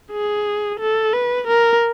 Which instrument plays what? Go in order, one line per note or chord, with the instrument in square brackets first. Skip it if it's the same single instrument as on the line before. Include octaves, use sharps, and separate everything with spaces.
[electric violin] G#4
A4
B4
A#4